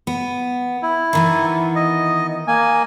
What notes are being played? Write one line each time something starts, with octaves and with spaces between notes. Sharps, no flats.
B3
E4
D#3 E3 B3
D#5
A#3 G#5